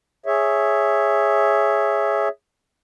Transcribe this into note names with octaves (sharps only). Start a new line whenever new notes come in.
G#4 C#5 E5